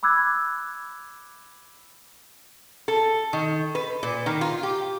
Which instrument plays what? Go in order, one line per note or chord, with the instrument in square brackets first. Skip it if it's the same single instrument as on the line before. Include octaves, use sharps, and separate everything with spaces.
[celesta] B5 D6 E6 F#6 G#6
[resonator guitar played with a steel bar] A4
D#3
B4
A#2
D#3
F4
G4